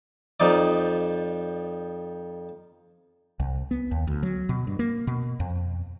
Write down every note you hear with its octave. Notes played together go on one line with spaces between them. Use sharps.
F2 F3 D#4 D5
C2
B3
D#2
D2
F#3
B2
G2
A#3
B2
F2